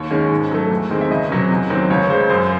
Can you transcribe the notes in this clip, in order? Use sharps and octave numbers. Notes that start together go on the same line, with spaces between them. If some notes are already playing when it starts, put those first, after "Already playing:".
Already playing: D#2 C#5
D#3 G#3 C#4
G#2
F#3 A3
E2
D#3 G#3 C4
E5
C#2 D#5
C3 F#3 C#4
E2
D#3 F#3 C4
C#2 C#5
C#3 G#3 C5
F#2 C5